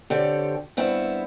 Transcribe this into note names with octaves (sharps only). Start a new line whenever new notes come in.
D3 C4 G4 A4 C#5
G2 B3 C4 E4